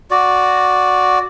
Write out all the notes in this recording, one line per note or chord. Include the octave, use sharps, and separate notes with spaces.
F#4 D5